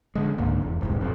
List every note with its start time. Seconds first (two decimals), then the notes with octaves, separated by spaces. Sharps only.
0.15 D3 G#3
0.38 C#2 G#2 D3 A#3
0.61 F1 E2
0.81 D1 C2 G#2
1.01 B1 F2